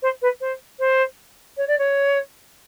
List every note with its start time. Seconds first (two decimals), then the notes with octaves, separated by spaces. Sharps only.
0.02 C5
0.21 B4
0.40 C5
0.79 C5
1.57 C#5
1.67 D5
1.78 C#5